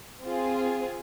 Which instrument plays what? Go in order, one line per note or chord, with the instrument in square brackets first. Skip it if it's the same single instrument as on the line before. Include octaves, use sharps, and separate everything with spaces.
[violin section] C4 F4 G#4